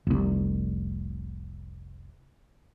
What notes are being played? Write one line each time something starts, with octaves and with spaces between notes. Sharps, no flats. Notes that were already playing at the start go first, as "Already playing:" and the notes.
F1 C2